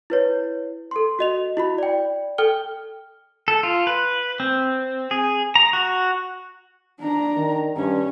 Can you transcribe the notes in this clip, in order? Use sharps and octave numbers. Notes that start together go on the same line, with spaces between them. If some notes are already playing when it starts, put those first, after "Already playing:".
E4 B4 C#5
A4 C6
F#4 D#5 F7
E4 F#4 B5
D5 G5
A4 G5 F6 G7
A4
F4
B4
C4
G#4
A#5
F#4
D4 A#5
D#3
G2 C#4